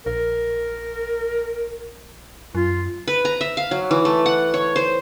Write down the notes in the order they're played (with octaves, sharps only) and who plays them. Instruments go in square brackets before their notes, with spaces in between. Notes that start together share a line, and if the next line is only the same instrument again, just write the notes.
[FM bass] A#1 [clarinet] A#4
[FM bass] F#2 [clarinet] F4
[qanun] B4
A#5
E5
F5
F#3
E3
A3
F#5
C#5
C5